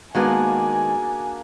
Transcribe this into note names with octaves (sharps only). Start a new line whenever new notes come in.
D#3 G#3 A#3 B3 D4 F#4 G#4 G#5